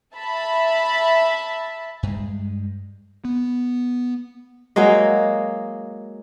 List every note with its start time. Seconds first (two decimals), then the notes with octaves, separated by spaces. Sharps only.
0.15 E5 A5 B5
2.03 G2 G#3
3.25 B3
4.76 F#3 G#3 A#3 D#5